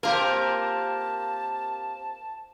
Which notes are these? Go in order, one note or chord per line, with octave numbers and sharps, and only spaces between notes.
A#3 C4 F4 G4 A#4 A5